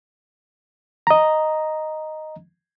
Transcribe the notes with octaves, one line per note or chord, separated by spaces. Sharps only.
D#5 A#5